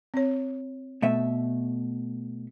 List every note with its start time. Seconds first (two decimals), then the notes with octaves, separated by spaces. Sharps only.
0.14 C4 C#5
1.02 B2 A3 E5